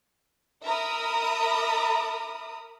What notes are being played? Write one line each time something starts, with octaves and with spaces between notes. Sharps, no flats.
A#4 E5 A#5 B5 D#6